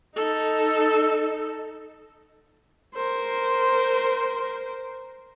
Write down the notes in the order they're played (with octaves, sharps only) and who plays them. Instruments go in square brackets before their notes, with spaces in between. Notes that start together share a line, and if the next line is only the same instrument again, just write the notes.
[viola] D#4 A4
A#4 C5